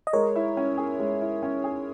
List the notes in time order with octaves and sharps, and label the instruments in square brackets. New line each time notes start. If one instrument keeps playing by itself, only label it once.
[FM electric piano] D#5
[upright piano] G#3 [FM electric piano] A#4 C#5
[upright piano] E4
C#4
G#4
G#3
E4
C#4
G#4